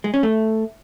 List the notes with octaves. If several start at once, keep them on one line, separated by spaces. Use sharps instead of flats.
G#3
C#4
A3